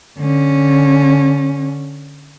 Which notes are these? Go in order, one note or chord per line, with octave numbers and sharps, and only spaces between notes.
D3 C#4